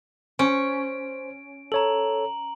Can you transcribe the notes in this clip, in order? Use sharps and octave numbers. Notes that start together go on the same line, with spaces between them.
C#4 C5 D7
A4 C#5 A#5 F#7